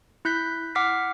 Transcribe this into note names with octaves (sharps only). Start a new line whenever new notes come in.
E4 F#6 G6 B6
F#5 D6 F6 B6 C7